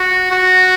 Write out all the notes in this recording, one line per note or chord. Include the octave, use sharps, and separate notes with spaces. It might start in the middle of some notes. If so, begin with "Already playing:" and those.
Already playing: F#4
F#4